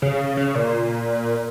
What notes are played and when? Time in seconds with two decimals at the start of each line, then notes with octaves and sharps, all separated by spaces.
0.02 C#3
0.37 C#3
0.55 A#2